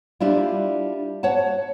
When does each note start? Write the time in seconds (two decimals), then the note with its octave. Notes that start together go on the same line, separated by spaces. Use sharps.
0.20 G3 D4 E4 F4
1.23 C#5 F#5 A5